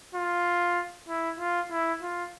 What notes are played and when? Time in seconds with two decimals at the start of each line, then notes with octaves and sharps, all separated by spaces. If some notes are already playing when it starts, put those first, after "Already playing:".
0.15 F4
1.09 E4
1.39 F4
1.71 E4
2.02 F4